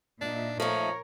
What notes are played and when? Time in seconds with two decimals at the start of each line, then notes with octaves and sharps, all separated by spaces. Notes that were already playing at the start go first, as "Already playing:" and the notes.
0.21 A#2 D4 D#4 E5
0.60 F3 A3 D#4 A#4 C#5